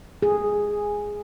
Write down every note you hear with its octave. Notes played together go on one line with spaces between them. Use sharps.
G#4